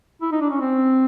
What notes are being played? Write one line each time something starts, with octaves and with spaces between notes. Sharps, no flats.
E4
D#4
D4
C#4
C4